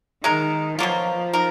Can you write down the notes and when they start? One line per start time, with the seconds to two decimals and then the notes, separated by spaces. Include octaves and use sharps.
0.23 D#3 G#3 D#4 A#4
0.79 B2 F3 F#3 A#3 F4
1.33 D#4 A#4